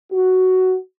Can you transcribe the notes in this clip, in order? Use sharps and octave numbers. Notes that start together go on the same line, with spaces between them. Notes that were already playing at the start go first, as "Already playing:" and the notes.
F#4